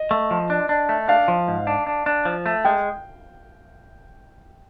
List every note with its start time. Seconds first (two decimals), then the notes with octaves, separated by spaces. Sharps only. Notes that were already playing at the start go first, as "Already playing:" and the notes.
Already playing: D#5
0.11 A3
0.31 F3
0.50 D4
0.69 D4
0.89 A3
1.08 D4 F5
1.28 F3
1.48 G#2
1.67 D4
1.87 D4
2.06 D4
2.25 F3
2.46 A3
2.65 G#3 G5